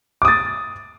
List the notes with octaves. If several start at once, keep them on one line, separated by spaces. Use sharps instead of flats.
D6 D#6 A6